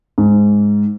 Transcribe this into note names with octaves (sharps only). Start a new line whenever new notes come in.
G#2